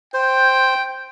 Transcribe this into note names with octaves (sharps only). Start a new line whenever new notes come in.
C5 G5